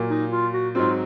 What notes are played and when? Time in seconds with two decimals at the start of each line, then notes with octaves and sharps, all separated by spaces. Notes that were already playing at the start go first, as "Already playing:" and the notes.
Already playing: A#2 F#3 A#3
0.10 D#4
0.32 F4
0.53 F#4
0.75 G#2 F#3 C4 F4